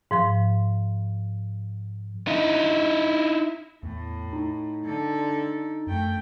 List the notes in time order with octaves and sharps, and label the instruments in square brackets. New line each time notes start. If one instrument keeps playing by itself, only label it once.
[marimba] G#2 F3 C6
[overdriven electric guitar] D#4 E4
[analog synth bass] E2 [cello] A2
[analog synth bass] D#4
[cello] D3 A4
[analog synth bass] F#2 [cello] A3 G5